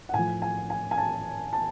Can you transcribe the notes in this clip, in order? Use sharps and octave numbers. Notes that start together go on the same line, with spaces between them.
F#5
A2 F3 G#5
G#5
G#5
G#5
A5
A5